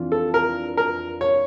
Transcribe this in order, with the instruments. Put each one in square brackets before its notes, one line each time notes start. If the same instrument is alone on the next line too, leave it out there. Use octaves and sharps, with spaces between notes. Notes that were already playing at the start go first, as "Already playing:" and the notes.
Already playing: [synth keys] F2 E3 D4 F4
[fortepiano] A4
A#4
A#4
C#5